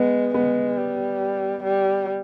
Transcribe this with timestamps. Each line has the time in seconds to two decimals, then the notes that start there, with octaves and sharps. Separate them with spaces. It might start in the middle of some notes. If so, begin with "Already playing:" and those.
Already playing: G#3 B3
0.34 G#3 B3
0.78 G3
1.63 G3